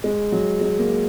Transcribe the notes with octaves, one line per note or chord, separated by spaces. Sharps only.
G#3
F#3
G#3
A#3